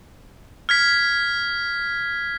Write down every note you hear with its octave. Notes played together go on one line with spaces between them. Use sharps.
F6 G#6 B6